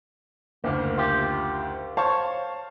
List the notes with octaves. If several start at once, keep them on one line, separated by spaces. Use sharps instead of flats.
F#1 D2 A#3
F4 G4
C5 C#5 F5 A5